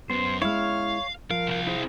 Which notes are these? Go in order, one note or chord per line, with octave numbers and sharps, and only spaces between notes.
F#2 B3 C5
G#3 C#4 E4 C#5 F5 F6
F3 A#4 F5
C2 F5
E4 G#4 C5